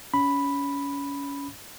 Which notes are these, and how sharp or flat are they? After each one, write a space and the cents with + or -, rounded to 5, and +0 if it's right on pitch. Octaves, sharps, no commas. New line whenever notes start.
C#4 +25 B5 +0